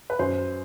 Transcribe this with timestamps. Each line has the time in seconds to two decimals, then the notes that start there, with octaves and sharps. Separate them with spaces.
0.10 B4
0.19 F#2 C5